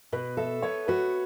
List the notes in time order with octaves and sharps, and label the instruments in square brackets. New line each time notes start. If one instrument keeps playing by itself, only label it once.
[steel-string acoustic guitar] B2 [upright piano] B4
[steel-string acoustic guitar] A4 [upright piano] E5
[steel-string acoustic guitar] B3 [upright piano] C#5
[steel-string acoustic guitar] F#4 [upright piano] B4